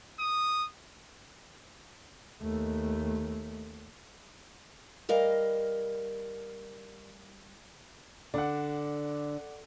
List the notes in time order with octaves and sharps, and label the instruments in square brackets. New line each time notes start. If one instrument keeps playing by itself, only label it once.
[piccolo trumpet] D#6
[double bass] D#2 A3
[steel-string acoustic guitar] G3 A#4 D#5 F5
[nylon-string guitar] D3 [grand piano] D5 F#5